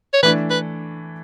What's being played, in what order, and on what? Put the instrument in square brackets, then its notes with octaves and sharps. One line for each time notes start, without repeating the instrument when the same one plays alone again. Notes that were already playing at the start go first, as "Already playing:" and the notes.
[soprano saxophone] C#5
[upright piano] E3 A3 D4 [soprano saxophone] B4
[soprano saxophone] B4